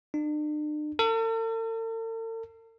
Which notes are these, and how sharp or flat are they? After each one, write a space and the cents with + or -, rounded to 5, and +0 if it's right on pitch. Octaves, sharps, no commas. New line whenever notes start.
D4 +45
A4 +45